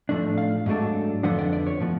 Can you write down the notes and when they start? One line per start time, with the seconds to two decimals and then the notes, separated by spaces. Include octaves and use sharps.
0.09 A2 F3 A3 D4
0.38 F5
0.66 G#2 F#3 A3 D4
1.23 F2 D3 F3 B3 D4 F#5
1.38 D5
1.53 D5
1.67 C#5
1.80 A2 F3 B3